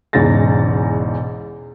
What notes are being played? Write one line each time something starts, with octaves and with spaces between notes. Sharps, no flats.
E1 E2 G#2 C#3 A6 A#6